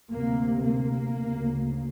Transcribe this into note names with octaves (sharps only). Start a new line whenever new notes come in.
D2 C3 A#3
A#3
D2 C#3